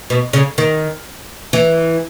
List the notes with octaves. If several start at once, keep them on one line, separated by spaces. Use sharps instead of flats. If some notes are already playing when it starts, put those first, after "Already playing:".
B2
C#3
D#3
E3